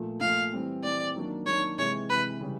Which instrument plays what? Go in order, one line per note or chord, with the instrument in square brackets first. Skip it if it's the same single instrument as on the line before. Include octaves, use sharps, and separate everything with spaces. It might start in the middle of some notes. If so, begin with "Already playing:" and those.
Already playing: [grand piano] A#2 F3 A3
[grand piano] A#2 F3 A3 [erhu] F5
[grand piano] E3 G3 C4
[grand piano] E3 G3 C4 [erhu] D5
[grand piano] D#3 F#3 A#3 D4
[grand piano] D#3 F#3 A#3 D4 [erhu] C#5
[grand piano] C3 E3 G#3 [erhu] C#5
[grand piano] C3 E3 G#3 [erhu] B4
[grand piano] C#3 E3 G3